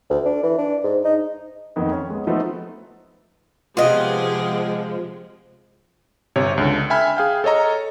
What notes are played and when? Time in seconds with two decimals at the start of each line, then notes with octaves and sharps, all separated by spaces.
0.10 D2
0.26 D4
0.43 E3
0.58 D4
0.83 G#2
1.05 D#4
1.76 F2 D#3 A#3 B3 D#4
1.92 C#4
2.10 G#3 B3
2.27 F3 A3 B3 C4 D#4
3.77 C3 F3 G#3 B3 F4 G4 G#4 D#5
6.36 G1 C3 C#5
6.58 C#2 D3
6.90 E5 G5 G#5 B5 F6
7.17 G#4 F5 G5
7.44 A4 C#5 D#5 A#5